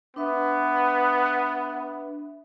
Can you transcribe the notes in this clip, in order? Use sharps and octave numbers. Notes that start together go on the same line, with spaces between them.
B3 D4 B4 E5